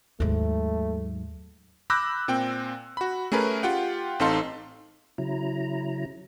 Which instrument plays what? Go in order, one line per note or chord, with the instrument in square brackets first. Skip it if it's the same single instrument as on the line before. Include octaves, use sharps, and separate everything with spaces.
[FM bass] D#2 [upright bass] G#2 F#3 [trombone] A3
[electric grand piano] B5 D6 E6 F#6 G6 A#6
A#2 C4 G5
F#4 B5
A3 C#4 G#4 A#4 B4
F4 G4 F#5 G5
A1 C4 D#4 A4 F5 C6
[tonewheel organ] C#3 F#3 E4 A#5